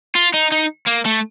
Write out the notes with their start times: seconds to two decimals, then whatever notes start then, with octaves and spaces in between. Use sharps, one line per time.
0.15 F4
0.34 D#4
0.52 D#4
0.86 A#3
1.05 A3